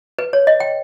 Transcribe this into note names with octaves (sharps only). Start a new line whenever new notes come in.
B4
C#5
D#5
G5